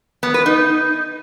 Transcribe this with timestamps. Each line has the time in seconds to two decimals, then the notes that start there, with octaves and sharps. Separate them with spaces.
0.23 B3
0.34 B4
0.46 D#4